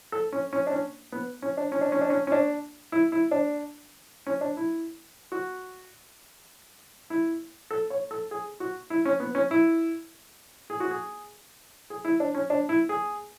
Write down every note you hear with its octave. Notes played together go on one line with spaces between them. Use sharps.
A4
C#4
C#4
D4
C#4
B3
C#4
D4
C#4
D4
C#4
D4
C#4
C#4
D4
E4
E4
D4
C#4
D4
E4
F#4
E4
A4
C#5
A4
G#4
F#4
E4
C#4
B3
C#4
E4
G#4
F#4
G#4
G#4
E4
D4
C#4
D4
E4
G#4